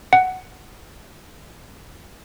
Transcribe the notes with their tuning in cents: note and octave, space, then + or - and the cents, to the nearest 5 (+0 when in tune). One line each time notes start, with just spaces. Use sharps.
F#5 +5